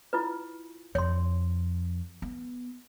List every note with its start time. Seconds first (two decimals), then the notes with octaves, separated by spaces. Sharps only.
0.13 E4 F4 B4
0.95 F2 C#5 C6
2.22 B3